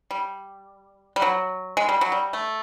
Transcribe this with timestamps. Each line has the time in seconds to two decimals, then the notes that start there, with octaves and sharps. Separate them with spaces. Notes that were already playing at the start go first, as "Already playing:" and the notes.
0.11 G3
1.16 G3
1.22 F#3
1.77 G#3
1.89 G3
2.01 F#3
2.12 G3
2.33 A3